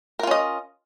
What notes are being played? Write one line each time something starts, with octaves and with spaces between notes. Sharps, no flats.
C#4 F4 A#4 D#5